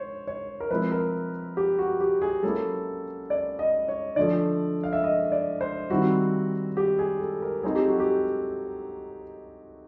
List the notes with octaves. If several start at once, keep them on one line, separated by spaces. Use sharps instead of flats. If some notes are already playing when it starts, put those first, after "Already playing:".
Already playing: C5 C#5
C#5
A#4
F3 G#3 C4 E4 B4
A#4
G4
F#4
G4
G#4
F#3 A#3 C#4 E4 A4
D5
D#5
C#5
D3 F3 A3 D5
F5
E5
D#5
D5
C5
D#3 G3 C4 E4 F#4
G4
G#4
A4
A#4
F#3 A3 C4 D#4 G#4
G4
F#4
G4